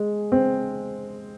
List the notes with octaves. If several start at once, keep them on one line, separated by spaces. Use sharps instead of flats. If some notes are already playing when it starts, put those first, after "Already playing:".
Already playing: G#3
C4